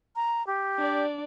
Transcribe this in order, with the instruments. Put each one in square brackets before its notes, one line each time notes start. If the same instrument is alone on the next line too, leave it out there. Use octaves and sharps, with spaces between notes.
[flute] A#5
G4
[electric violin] D4 D5